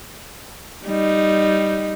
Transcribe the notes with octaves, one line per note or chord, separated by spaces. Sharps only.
G3 D#4